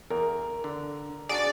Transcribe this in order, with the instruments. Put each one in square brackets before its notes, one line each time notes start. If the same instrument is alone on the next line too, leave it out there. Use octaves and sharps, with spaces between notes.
[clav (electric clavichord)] E2 [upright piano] A#4
[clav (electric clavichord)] D3
[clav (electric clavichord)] D4 F#4 G#4 [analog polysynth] D5